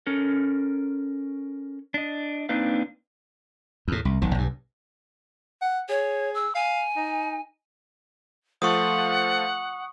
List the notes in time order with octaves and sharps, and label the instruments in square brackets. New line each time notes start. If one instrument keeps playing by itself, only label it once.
[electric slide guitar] C#4 A4 A#4
D4 D#5
A#3 C4 D4 D#4 B4 F5
[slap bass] E2 A2
C2
E1 B1 D#3
B1 G2
[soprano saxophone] F#5
[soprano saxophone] G#4 [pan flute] C#5
[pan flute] E6
[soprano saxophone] F5 [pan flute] G#5
[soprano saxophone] D#4
[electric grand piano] F3 A3 F4 [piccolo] F#5 [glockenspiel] C#6 D#6